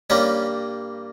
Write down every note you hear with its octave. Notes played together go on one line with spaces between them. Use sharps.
G2 G3 A#3 C#4